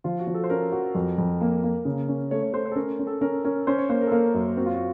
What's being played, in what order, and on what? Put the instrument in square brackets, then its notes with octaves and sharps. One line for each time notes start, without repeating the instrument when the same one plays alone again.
[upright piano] F3 [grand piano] F4
[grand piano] F#4
[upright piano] F3
[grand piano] A4
C5
[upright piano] C#4 [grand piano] A#4
[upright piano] F#4
F2
F2
A#3
A#3
C#3
C#4
[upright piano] A3 [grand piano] C#5
[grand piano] C#5
[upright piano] A3 [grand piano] C5
[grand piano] C5
A4
[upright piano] C#4 [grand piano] A#4
[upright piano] C#4
[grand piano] A4
[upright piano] C#4 [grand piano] A#4
[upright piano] C#4 [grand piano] A#4
[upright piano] C#4 [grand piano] C5
[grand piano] C#5
[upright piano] A#3 [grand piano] C5
[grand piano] A#4
A4
[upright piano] A#3 [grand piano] A#4
[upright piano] F#2
[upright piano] C4 [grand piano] F#4
[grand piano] F4
F#4